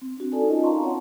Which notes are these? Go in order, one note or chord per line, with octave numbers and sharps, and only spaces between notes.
C4
D4 F#4
D#4 A4 D5 G#5 A5
C#4 D#4 F4 A#4 D#5
F5 A5 A#5 C6 C#6
C4 C#5 F#5